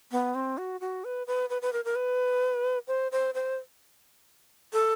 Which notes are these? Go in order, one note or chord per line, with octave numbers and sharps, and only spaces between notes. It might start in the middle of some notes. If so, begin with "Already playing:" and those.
B3
C4
F#4
F#4
B4
B4
B4
B4
A#4
A#4
B4
C5
C5
C5
A4